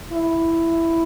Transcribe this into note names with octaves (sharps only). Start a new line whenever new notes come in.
E4